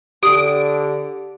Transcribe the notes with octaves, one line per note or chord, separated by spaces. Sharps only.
D3 G4 D#6 D7